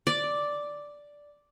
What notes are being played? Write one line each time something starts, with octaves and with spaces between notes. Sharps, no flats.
D5